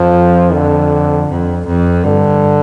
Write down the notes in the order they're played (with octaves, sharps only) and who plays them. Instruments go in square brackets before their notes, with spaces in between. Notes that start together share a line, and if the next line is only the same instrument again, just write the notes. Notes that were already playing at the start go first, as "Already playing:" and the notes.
Already playing: [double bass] F2 [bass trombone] F3
[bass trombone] D3
[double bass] F2
F2
[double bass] G2 [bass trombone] D3